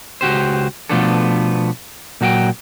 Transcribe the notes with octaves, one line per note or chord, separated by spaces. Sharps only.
C#2 F#4 G4 C5
B2 F3 A3 B3 D4 A4
A#2 F#3 F#4 F5 G5